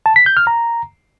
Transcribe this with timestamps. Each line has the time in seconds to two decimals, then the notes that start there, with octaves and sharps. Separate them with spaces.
0.06 A5
0.16 B6
0.26 G6
0.37 F6
0.47 A#5